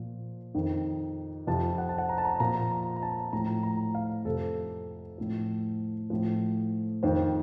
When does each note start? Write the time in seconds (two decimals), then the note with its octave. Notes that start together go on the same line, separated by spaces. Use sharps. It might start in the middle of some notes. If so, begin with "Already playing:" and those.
Already playing: A#2 F3
0.55 F2 D#3
1.47 F2 C3 F3 A5
1.78 F#5
1.89 A5
1.98 F#5
2.09 A#5
2.18 A5
2.25 A#5
2.40 A#2 F3 A#5
2.71 A#5
2.96 A#5
3.02 A5
3.33 A2 F3 A#5
3.63 A#5
3.95 F5
4.25 F2 C3 F3 A4
5.18 A2 F3
6.10 A2 F3
7.03 F2 D#3 C5